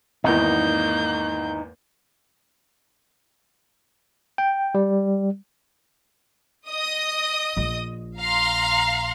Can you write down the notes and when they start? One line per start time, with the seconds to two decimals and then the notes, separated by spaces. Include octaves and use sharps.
0.24 G#1 E2 A#3 D#4 E4 G6
4.38 G5
4.75 G3
6.68 D#5 D#6
7.57 A#1 A#2
8.19 F5 A#5 C6